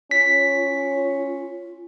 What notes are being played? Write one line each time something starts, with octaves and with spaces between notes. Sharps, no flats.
C#4 F4 B6